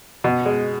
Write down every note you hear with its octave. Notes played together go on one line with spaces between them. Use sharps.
B2
G#3